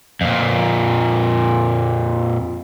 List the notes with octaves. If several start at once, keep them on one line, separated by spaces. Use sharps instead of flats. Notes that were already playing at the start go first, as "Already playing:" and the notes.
F2 A#2